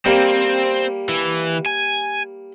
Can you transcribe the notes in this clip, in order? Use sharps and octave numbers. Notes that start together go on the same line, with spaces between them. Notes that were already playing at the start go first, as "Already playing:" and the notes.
G3 A#3 C4
E3
G#5